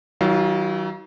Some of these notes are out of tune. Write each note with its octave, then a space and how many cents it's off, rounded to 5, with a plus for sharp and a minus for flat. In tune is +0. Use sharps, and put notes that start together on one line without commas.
D#3 +45 F#3 +40 F4 -5